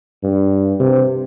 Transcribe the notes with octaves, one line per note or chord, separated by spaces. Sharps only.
G2
C3